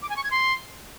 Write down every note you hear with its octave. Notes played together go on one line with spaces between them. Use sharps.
D6
G#5
C#6
G#6
C6